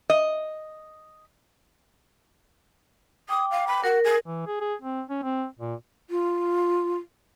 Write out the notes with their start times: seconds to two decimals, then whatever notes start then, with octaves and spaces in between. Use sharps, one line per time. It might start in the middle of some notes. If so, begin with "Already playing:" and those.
0.10 D#5
3.29 G5 D6 D#6
3.50 F5
3.67 B5
3.84 F#4 A#4
4.04 G#4
4.26 E3
4.47 G#4
4.61 G#4
4.82 C4
5.10 C#4
5.23 C4
5.59 A#2
6.10 F4